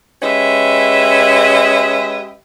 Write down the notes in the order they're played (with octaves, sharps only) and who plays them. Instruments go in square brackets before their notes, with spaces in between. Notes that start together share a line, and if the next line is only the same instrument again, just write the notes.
[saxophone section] G#3 C#4 G4 B4 D#5 E5